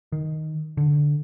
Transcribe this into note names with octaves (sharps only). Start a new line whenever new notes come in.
D#3
D3